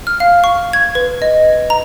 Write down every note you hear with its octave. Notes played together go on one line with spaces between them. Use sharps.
F6
F5
C#6
G#6
B4
D#5
A#5